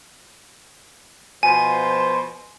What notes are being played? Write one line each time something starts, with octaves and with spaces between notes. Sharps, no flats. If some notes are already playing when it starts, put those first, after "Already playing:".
B2 F3 C5 G#5